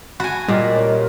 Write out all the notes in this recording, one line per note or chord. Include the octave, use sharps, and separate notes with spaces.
F#4 F#5 G#5 A5 B5
A#2 G3 F4 A#4 D5 D#5 G5
C#3 G4